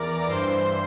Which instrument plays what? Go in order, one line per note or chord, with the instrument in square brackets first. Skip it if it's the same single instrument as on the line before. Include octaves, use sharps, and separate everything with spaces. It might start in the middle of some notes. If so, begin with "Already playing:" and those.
Already playing: [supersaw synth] E2 E3 A#4 D5 A#5 D6
G2 E3 C5 C6